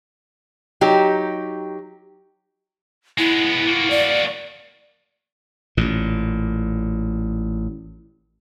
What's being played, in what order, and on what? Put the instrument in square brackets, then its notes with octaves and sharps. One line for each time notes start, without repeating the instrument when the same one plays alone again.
[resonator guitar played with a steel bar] F#3 D#4 G4
[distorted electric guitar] G#3 B3 [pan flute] E4
[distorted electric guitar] A#3 F#4
[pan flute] D5
[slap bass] A1 A#2